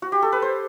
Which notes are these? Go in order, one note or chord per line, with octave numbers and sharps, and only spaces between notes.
F#4
G4
A4
B4
C5